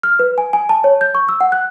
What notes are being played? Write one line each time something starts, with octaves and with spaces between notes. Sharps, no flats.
F6
B4
G#5
G#5
A5
C#5
G6
C#6
E6
F#5
F#6